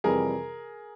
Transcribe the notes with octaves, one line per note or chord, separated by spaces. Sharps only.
F2 C3 E3 G3 G#4 A#4